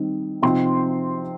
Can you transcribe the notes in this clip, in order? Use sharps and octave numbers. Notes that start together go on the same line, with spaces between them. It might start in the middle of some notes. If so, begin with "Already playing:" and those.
Already playing: D#3 G3 C4 D#4
C3 F3 C4 D#4 C6